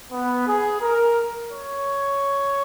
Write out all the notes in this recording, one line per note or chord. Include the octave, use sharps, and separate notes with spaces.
B3
G#4
A#4
C#5